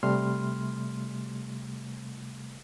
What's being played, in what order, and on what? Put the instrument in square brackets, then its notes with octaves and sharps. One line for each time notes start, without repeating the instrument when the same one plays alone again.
[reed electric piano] C3 G3 A3 C6 F6